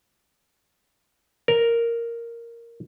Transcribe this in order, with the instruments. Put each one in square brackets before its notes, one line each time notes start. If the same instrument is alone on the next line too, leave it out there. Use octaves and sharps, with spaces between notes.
[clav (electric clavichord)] A#4